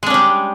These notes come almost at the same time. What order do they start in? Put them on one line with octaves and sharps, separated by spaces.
G#3 D4 C#4 G3